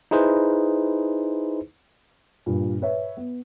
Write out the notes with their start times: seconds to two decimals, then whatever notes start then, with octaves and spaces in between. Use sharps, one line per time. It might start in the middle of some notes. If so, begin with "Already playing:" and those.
0.11 D#4 E4 G#4 B4 C5
2.46 G2 A#2
2.82 B4 C#5 E5
3.17 B3